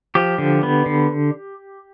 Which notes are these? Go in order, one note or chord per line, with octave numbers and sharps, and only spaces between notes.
F3 G4
D3
B3
D3